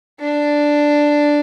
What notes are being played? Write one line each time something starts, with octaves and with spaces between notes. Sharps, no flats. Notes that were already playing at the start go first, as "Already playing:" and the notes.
D4